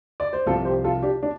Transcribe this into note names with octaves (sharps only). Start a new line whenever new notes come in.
D5
C5
C2 C3 F3 F4 A4
G4 C5
F4 A4
D4 G4
D4